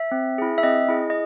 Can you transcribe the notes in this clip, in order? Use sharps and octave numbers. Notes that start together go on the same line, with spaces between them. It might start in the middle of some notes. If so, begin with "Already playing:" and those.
Already playing: E5
C4
E4 G#4
E5
C4 D#5
E4 G#4
D#5